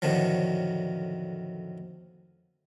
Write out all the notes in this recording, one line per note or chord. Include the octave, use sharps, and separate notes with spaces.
F2 A2 D3 D#3 F3 F#3